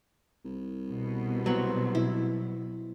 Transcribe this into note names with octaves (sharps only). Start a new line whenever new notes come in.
C2
B2
F#3 B3 C4
E4